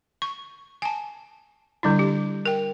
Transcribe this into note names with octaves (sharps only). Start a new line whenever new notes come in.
C#6
G#5 A5
D3 G3 D4 E4
G4
A#4 G5